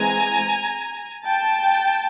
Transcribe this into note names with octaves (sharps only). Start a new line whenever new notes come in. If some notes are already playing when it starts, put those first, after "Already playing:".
Already playing: E3 G#3 C4 G#5 A#5
G5 A5